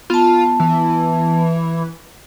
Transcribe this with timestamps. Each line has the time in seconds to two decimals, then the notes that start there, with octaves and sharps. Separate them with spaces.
0.10 B3 F4 A5
0.60 E3